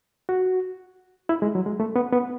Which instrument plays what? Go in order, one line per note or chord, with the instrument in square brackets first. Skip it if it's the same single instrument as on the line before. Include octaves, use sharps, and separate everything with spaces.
[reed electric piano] F#4
E4
G#3
F#3
G#3
A3
B3
B3